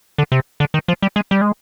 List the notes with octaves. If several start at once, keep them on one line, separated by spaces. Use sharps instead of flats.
D3
C3
D3
D#3
F3
G3
G#3
G3
G#3